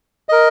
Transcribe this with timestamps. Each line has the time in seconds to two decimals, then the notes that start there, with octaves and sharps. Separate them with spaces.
0.29 A#4 D#5